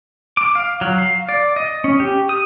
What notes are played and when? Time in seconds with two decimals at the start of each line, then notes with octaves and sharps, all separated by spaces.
0.37 D6
0.55 F5
0.81 F#3
0.98 F5
1.29 D5
1.56 D#5
1.84 C#4
2.00 G4
2.29 D#6